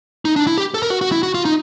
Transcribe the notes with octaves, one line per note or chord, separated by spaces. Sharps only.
D#4
D4
E4
G4
A4
A#4
F#4
F#4
E4
F#4
F4
D#4